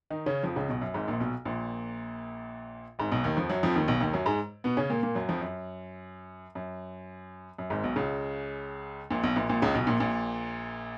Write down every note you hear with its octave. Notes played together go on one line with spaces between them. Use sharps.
D#3 D#4
C#3 C#4
F2 F3
C#2 C#3
B1 B2
F#2
G#1 G#2
A#1 A#2
B1 B2
A#1 A#2
G#1 G#2
B1 B2
D#2 D#3
F2 F3
F#2 F#3
F2 F3
D#2 D#3
B1 B2
D#2 D#3
F#2 F#3
G#2 G#3
B2 B3
C#3 C#4
A#2 A#3
A#2 A#3
F#2 F#3
F2 F3
F#2
F#2
F#2
G#1 G#2
B1 B2
C#2 C#3
A#1 A#2
B1 B2
A#1 A#2
A#1 A#2
C#2 C#3
B1 B2
A#1 A#2
A#1 A#2